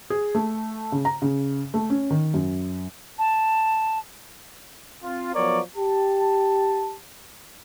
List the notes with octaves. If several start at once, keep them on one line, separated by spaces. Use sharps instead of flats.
G#4
A3
C#3
A#5
C#3
A3
C#4
D#3
F#2
A5
C4 F4
F3 F#3 B3 A#4 C#5 D5
G4 A5